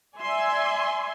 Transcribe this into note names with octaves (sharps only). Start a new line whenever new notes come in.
D5 E5 G#5 C6